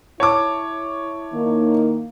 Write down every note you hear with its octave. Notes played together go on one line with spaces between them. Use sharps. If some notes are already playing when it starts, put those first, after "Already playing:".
E4 C#5 A5 D6
D#3 A#3